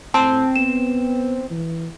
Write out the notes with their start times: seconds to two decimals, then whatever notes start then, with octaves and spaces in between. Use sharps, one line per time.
0.14 A2 C4 A5
0.56 B3 E7
1.51 E3